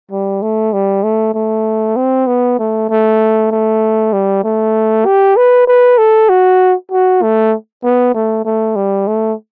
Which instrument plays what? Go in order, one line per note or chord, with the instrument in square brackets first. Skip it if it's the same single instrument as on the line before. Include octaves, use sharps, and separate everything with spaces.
[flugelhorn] G3
A3
G3
A3
A3
C4
B3
A3
A3
A3
G3
A3
G4
B4
B4
A4
F#4
F#4
A3
B3
A3
A3
G3
A3